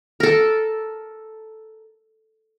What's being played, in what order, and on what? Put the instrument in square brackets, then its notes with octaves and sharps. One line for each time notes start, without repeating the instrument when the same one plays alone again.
[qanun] A4 A#4